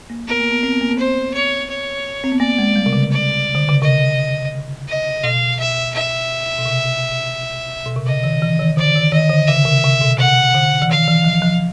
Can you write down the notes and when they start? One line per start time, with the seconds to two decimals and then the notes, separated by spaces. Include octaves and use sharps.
0.10 A#3
0.28 B3 A#4
0.40 A#3
0.51 B3
0.63 C4
0.72 B3
0.81 A#3
0.89 B3
0.98 C4 C5
1.34 C#5
1.69 C#5
2.24 C4
2.32 B3
2.40 A#3 D5
2.58 G#3
2.76 G3
2.86 C3
2.93 C#3
3.11 D5
3.55 D3
3.69 C#3
3.82 C3 D#5
4.88 D#5
5.23 B2 F5
5.59 E5
5.94 E5
6.59 B2
6.65 C3
7.86 B2
7.96 C3
8.06 C#3 D#5
8.24 D#3
8.42 E3
8.60 D#3
8.77 D3 D5
8.95 D#3
9.12 D#3 D#5
9.30 D3
9.48 C#3 E5
9.65 C3
9.84 C3
10.01 B2
10.19 C3 F#5
10.55 D3
10.82 E3
10.90 D#3 F5
11.08 E3
11.24 F3
11.42 F3